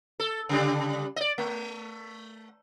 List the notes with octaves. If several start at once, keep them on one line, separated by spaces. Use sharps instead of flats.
A4
C#3 G3 D4
D5 D#5
A3